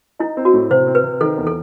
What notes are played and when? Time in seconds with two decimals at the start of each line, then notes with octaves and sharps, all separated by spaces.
0.19 D#4 E4
0.37 C4
0.45 F#4
0.54 A2
0.70 C3 C5
0.87 C4
0.95 B4
1.04 C3
1.21 D#3 A4
1.38 E2
1.47 A4